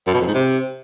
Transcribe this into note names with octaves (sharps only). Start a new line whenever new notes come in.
F#2
B2
F2
G#2
C3